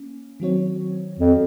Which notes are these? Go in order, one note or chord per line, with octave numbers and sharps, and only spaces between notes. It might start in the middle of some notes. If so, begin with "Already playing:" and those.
Already playing: A#3 C#4
D#3 F#3 C4 F#4 C#5
F2